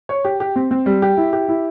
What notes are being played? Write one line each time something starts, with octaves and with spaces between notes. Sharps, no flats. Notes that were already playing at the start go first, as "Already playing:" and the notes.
C#5
G4
G4
C4
C4
G3
G4
E4
G4
E4